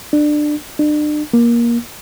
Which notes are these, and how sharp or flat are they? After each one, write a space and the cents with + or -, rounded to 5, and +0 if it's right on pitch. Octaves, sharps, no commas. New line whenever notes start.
D4 +20
D4 +35
A#3 +20